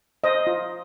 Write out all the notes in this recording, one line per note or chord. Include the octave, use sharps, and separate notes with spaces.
C5 D#5
F4